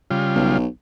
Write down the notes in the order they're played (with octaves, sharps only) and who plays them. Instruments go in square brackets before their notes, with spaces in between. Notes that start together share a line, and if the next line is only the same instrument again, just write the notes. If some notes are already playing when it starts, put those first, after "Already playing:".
[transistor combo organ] C#3 G3 F4
[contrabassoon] B1